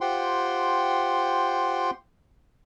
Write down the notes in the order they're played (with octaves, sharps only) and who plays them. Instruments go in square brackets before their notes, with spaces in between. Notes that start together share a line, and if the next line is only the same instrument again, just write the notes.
[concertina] F4 G4 C5 F#5 G5 C6